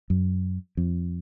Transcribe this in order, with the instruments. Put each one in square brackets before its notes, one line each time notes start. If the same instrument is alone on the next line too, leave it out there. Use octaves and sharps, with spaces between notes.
[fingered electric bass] F#2
F2